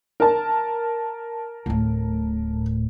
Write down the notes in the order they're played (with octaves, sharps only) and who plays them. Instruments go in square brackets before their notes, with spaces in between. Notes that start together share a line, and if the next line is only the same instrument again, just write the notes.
[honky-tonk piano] A#4 A5
[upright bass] D1 A2